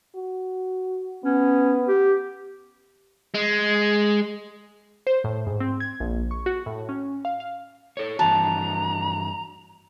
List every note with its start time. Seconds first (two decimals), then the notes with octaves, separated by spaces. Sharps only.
0.15 F#4
1.24 B3 C#4
1.88 G4
3.34 G#3
5.07 C5
5.24 A2
5.47 G#2
5.60 C4
5.80 G#6
6.00 A#1
6.31 C#6
6.46 F#4
6.66 A2
6.89 C#4
7.25 F5
7.40 F5
7.97 A4 C#5
8.19 G2 E3 F#4 A5 A#5